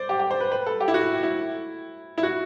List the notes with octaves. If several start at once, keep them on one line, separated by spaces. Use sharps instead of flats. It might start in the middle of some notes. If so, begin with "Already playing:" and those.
Already playing: C5 D5
G4
G4
C5
B4
B4
A4
G4
E4
F#4
E4
E4
F#4